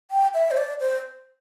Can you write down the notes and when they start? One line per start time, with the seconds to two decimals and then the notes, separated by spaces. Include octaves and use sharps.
0.11 G5
0.34 E5
0.51 C5
0.57 D5
0.80 C5